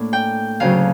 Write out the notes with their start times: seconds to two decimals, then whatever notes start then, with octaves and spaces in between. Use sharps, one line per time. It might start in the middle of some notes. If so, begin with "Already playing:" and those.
Already playing: A2 A#3 D4
0.13 G5
0.60 D2 C#3 F#3 F5